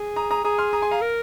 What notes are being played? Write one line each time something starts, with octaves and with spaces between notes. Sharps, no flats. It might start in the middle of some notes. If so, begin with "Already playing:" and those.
Already playing: G#4
A#5 D#6
A#5 D#6
G#4 A#5 D#6
C6 F6
A#5 D#6
G#5 C6
F5 A#5
A#4